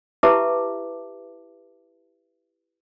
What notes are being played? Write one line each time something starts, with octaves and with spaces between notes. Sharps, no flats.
E4 G4 B4 E5 A5 D6